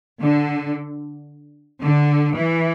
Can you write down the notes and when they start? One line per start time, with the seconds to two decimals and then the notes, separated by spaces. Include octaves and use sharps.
0.21 D3
1.83 D3
2.36 E3